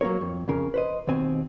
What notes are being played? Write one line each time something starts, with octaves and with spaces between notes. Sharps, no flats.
F#3 A#3 C#4 A#4 C#5
F2
F2 C#3 A#4
B4 C5 D#5
D#2 B2 C4 G#5